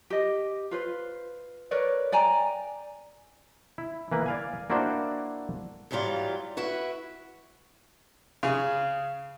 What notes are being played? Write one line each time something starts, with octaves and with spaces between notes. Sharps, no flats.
G4 D#5
F4 B4 C5
A#4 B4 C#5 D5
D5 G5 G#5 A#5
E4
E3 A#3 B4
D5 F5 G#5
A#3 D4 E4 F#4 C5 D5
G#2 E3 F#3 G3 F4
E4 F#4 B4
C#3 G#4